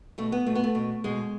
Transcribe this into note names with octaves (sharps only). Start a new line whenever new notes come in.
B2 A3
B3
B2 A3
B3
A3
B2
B2 G#3